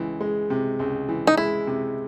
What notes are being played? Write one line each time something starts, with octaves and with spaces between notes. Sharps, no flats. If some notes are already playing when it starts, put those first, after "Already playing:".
Already playing: C#2 E3
G#3
C3
C#2
E3
D#4
G#3 E4
C3